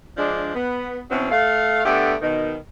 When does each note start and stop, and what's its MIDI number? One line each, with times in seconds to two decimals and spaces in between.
0.17 0.53 53
0.17 0.53 56
0.17 0.53 62
0.54 1.00 59
1.10 1.29 47
1.10 1.29 52
1.10 1.29 54
1.10 1.29 60
1.10 1.29 61
1.31 1.83 57
1.31 1.83 77
1.85 2.15 50
1.85 2.15 57
1.85 2.15 59
1.85 2.15 62
1.85 2.15 67
2.21 2.55 47
2.21 2.55 51